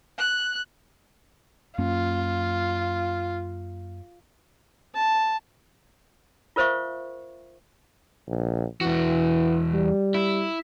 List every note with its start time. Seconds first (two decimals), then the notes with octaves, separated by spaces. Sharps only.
0.18 F#6
1.79 F#2 A#3 C#4 F4
4.95 A5
6.56 F4 A#4 C5 E5 F5 C#6
8.28 A#1
8.81 E2 E3 F#4
9.74 G3
10.14 E4